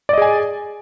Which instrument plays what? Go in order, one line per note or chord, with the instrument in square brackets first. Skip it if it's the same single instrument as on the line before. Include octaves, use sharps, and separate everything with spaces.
[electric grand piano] D5
D#5
G#4
G#5